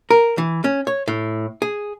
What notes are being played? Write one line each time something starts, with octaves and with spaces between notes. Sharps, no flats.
A#4
E3
C#4
C#5
A2
G#4